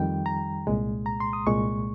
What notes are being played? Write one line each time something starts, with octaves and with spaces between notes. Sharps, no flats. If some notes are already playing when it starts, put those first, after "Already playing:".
Already playing: F2 D#3 G3 G5
A#5
C2 A#2 G#3
A#5
C6
D#6
C2 A#2 G#3 C#6